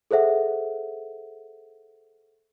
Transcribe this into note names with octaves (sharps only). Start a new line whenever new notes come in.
G#4 A4 C5 E5 F#5